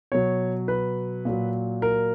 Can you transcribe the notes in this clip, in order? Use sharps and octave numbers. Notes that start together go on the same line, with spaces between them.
B2 F#3 C#5
B4
A#2 F#3
A#4